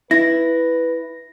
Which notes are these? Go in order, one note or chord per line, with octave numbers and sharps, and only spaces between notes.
E4 B4 A#6